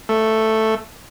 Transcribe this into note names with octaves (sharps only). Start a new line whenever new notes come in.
A3